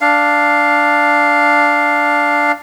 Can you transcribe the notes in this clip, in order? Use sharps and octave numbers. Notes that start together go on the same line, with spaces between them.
D4 F5